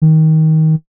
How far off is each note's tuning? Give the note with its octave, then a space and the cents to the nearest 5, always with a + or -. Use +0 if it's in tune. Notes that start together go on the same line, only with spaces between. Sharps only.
D#3 +20